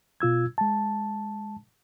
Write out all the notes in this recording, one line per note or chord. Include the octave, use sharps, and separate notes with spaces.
B2 F4 E6 G#6
G#3 A5